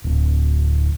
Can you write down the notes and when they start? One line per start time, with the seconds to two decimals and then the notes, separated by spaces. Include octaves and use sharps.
0.05 D1